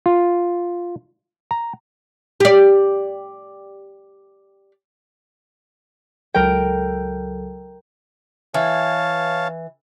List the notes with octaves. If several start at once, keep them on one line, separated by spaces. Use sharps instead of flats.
F4
A#5
G4 D5
C#2 F#3 A4 A#4 G5
E3 C#5 F5 A5